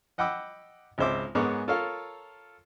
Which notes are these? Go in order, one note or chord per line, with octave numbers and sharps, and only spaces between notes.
D#5 F#5 G5 B5 D6 E6
G#1 C#2 G#3 C5 E5 D6
G#2 B3 G#4 A#4 C#5 D6
F4 A4 A#4 C#5 F5